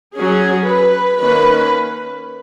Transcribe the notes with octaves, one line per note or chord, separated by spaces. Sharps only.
F#3 C#4 G#4
B4
D#3 A#3 C#4 B4